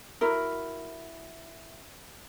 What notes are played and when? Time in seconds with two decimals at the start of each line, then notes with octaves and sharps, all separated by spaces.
0.21 E4 F#4 A#4